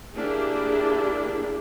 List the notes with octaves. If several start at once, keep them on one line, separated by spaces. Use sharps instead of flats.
A#3 D4 E4 G4 G#4